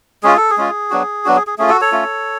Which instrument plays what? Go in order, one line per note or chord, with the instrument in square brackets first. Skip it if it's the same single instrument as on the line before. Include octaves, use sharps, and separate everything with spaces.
[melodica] G#3 C#4 F4 G#4
A4
G#4
G#3 C#4 F4
F#3 B3 D4 F#4
F#3 B3 D4 F#4
G#4
G#4
A3 C#4 F4 G#4
F#4 A4
A4 C#5
A3 C#4 F4